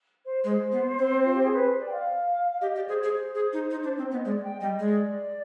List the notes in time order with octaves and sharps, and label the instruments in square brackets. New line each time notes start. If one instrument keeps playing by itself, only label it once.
[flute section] C5
[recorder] G#3 [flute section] C5
[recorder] B3
C4
[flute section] F4
G4
G#4
B4
C5
D5
G5
F5
F5
[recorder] G4 [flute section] D#5
[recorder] G4 [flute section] D5
[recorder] G#4 [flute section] C5
[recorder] G#4 [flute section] C5
[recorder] G#4
D#4
D#4
D4
C4
[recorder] B3 [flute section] D#5
[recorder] G#3 [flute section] D5
[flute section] G5
[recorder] G3 [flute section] D#5
[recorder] G#3 [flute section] D5